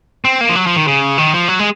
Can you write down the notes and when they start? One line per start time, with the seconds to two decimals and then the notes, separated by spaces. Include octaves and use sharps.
0.25 C4
0.41 A#3
0.49 F3
0.55 F#3
0.66 F3
0.76 D#3
0.88 C#3
1.18 D#3
1.34 F3
1.48 F#3
1.59 G#3